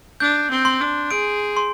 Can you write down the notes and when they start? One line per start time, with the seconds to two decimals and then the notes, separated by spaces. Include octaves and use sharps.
0.20 D4 G6
0.50 C4
0.65 C6
0.81 D4
1.11 G#4 D7
1.57 C6